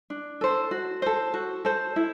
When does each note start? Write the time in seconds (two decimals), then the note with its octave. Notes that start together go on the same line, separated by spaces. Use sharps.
0.10 D4
0.41 A4 C5
0.71 F#4
1.02 A4 C5
1.34 F#4
1.65 A4 C5
1.96 E4